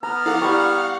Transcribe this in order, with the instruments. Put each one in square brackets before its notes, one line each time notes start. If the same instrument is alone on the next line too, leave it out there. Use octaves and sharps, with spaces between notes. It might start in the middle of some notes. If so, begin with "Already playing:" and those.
[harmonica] B3 F6 [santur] A#5
[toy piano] E4 G#4 [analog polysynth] F5 F#5
[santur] G3 C#6 [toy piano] E4 G5